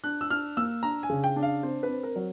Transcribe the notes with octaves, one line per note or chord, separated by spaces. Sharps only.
D4 F#6
E6
D4 F6
A#3 E6
D4 A#5
G#5
C#3
G5
D4
F5
C4 C5
B4
C4
A#4
F#3